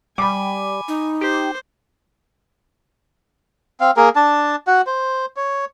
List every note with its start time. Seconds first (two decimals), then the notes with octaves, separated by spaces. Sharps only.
0.18 G3 G#5 B5 D6
0.88 D#4
1.21 G4 C5
3.81 C4 F5
3.97 A#3 G#4 A#4
4.16 D4 A5
4.67 F#4 F#5
4.87 C5
5.37 C#5